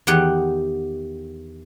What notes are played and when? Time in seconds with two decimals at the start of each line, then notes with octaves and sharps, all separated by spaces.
0.07 E2 D#3 D#4 G4 F#5 G5